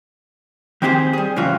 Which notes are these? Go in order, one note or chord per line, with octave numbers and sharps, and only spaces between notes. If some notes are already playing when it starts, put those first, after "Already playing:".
D#3 C4 E4 G4 G#4 C5
G3 G#4
A2 C#3 E3 F#3 F4 F#4